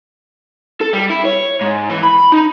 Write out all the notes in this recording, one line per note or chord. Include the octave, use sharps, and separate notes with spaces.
A4
G3
E4
C#5
G#2
E3
B5
D#4